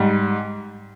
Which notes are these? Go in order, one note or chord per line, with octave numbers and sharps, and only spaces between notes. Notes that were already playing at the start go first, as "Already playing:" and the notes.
Already playing: G#2 G3